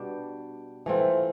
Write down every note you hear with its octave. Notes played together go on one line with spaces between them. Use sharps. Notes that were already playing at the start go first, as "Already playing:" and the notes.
Already playing: B2 G3 D4 G4
E3 A3 C4 F4